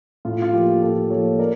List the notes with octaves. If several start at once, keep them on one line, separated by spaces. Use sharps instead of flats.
A2 F4
F4
F3 A#3 G4
A2 F4 A4
F3 A#3 A4 C#5
A#4 D5